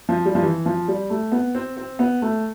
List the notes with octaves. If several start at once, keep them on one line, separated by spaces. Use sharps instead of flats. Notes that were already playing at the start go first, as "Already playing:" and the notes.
F3
G3
F3
E3
F3
G3
A3
B3
C4
C4
B3
A3